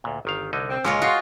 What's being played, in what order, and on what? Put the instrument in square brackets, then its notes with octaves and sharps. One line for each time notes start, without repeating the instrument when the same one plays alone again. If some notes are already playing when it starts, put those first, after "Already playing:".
[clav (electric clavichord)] D2 A#2
G1 D#3 F5
C2 D3 D#4
[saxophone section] C4
[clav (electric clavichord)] C#2 A#2 D3 [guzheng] G#3 A#4 C#5 [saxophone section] F4
[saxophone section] F4 [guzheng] F#4 G#4